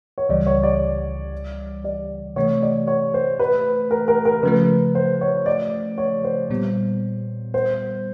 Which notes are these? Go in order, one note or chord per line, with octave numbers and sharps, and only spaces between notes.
C#5
C#2 C#3 E3 G3 D5
C#5
D5
D5
C3 E3 A3 C#5
D5
C#5
C5
B4
A#4
A#4
A#4
C#3 F3 A3 B4
C5
C#5
D5
C#5
C5
A#2 G3 B3
C5